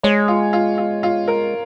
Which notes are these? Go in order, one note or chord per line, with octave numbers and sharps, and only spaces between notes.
G#3 C#5
F4
F4
F4
F4
A#4